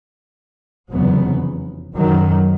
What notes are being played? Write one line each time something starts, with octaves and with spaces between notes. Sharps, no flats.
F1 E2 C#3 F#3 B3
F#2 D#3 F#3